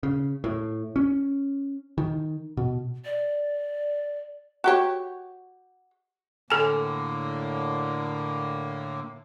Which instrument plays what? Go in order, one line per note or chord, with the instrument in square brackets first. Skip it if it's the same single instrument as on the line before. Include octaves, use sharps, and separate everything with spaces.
[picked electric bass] C#3
A2
C#4
D#3
B2
[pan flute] D5
[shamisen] F#4 G4 C#5
[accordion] A2 D3 A#3 [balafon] A4 G#5